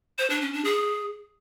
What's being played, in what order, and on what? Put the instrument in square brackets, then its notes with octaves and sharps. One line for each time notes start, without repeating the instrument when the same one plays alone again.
[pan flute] C5
D4
C#4
D4
G#4